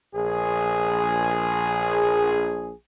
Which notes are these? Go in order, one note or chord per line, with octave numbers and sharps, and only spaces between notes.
A#1 G#4